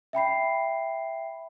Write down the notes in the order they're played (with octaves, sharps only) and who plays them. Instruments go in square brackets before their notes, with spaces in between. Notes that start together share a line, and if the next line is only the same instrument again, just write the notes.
[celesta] E5 G5 B5 C7